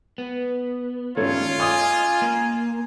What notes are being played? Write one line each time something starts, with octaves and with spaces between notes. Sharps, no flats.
B3
G2 D#3 A3 C#4 F4 C#5
D#5 G#5 D6 D#6
A#3